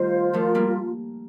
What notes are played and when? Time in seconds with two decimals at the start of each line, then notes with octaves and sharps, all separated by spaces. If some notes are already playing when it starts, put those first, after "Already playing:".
Already playing: D#3 G3 A3 F4 C5
0.33 F3 A3 A#4
0.55 G3 A#3